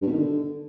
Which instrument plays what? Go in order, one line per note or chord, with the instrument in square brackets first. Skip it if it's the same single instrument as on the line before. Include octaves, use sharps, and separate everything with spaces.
[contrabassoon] G2
B2
D#3
D3